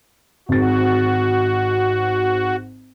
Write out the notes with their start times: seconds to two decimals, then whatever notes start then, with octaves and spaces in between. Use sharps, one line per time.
0.49 G#1 G#2 F#4 A6